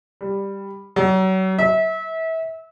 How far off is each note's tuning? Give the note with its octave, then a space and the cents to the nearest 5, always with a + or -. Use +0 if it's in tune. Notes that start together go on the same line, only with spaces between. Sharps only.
G3 +10
F#3 +35
E5 -30